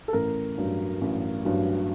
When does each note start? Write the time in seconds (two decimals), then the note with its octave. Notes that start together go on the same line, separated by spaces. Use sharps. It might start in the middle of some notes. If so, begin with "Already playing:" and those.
0.08 A4
0.13 A1 A#4
0.58 G2 F#3
1.01 A1
1.45 G2 F#3